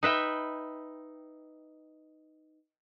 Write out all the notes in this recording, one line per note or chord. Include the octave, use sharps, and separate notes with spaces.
D#4 B4 E5 G5